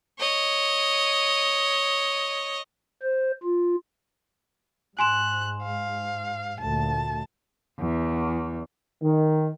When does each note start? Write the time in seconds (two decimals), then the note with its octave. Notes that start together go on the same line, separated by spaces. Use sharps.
0.19 C#5 D#5
3.02 C5
3.43 F4
4.99 G#2 G#5 C6 F#6 E7
5.64 F5
6.61 D2 A#2 A5
7.79 E2
9.02 D#3